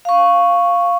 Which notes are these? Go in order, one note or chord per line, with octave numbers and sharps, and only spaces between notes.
F5 C#6